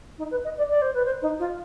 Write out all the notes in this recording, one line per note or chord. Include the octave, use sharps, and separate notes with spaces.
D#4
B4
D#5
D5
D5
C5
B4
C5
D#4
F4